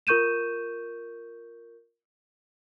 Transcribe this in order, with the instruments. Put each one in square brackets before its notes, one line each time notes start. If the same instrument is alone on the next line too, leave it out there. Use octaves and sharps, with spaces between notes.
[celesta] F4 A#4 C#6 G6 D#7 E7